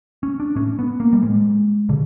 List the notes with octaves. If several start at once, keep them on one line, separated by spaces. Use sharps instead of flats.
C#4
D4
A2 C#4
B3
A#3
G3
A2 G#3
A#2 D3